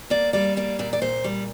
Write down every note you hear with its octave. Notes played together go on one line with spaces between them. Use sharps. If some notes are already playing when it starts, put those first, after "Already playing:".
A#3 D5
G3 D5
A#3 D5
A#2 D5
D5
A#2 C5
G3